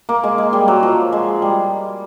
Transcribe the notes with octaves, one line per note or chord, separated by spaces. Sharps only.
A#3
G#3
G#3
G3
F#3
F3
G#3
G3